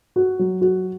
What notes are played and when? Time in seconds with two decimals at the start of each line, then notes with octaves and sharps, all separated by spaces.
0.16 F#4
0.39 F#3
0.61 F#4